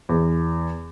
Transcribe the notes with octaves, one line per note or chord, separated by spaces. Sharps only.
E2